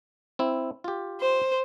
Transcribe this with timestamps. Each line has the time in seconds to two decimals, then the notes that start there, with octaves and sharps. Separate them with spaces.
0.39 C4 E4
0.84 F4 G4
1.21 C5